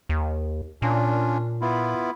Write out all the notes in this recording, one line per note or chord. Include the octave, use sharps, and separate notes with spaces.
D#2
A#2 C#4 D4 F4
B3 E4 F4